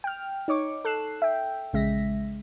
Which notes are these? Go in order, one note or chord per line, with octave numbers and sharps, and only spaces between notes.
G5 F6
D#4 C#5 C#6 D6
A4 F#6 C7 E7
E5 G5
A#1 C#3 G#3 E5 A#6 B6